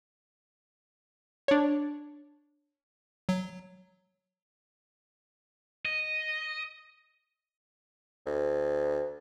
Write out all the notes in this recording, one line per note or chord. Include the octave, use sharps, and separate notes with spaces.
D4 C#5
F#3
D#5
D2